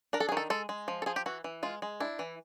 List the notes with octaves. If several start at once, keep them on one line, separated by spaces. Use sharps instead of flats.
D4 A#4
A4
G#4
D#3 A4
G#3 A4
G#3
F3
A4
F3 G#4
G4
E3 F#4
E3
G#3 F4
G#3
D4 E4
E3